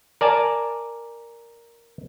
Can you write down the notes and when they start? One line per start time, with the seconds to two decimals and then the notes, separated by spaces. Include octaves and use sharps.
0.21 A#4 D5 G#5 A5